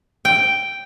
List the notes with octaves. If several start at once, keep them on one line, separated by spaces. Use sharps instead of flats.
G5